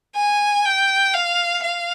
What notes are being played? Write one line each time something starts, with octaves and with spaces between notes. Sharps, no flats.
G#5
G5
F5
F5